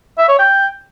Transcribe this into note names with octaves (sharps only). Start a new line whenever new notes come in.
E5
C#5
G5